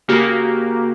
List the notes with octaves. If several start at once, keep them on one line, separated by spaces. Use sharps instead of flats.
C#3 A#3 F#4 G4